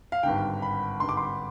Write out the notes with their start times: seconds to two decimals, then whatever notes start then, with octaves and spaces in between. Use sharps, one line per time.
0.12 F5
0.23 G#1 G2 D3 G5
0.62 B5
1.00 G#1 G2 D3 C6
1.09 D6
1.17 C6